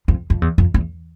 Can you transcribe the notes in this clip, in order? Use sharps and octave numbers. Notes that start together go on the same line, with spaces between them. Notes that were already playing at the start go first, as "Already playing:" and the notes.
F2
F2
E2
F2
E2